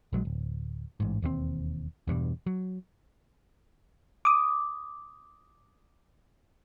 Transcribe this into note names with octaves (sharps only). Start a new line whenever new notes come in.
A#1 F#3 G#3
D1
A1 G#2
E1 D#2 A#2 C4
E2 G2 B2
F#3
D6 D#6